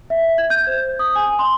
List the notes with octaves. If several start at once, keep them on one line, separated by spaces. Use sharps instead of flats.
E5
G#6
G6
C5
D#6
G#5
C6